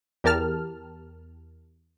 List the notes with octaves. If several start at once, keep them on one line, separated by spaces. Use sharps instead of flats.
E2 G4 A#4 A5 F6